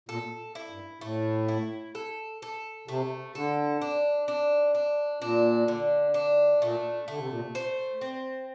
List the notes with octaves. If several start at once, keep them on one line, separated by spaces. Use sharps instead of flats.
A#2 A4
E4
G2
A2 A3
E4
A4
A4
C3 A3
D3 A4
D4
D4
D4
A#2 D4
D3
D4
A#2 A3
D3 A3
C3
A#2
C3
C5
C4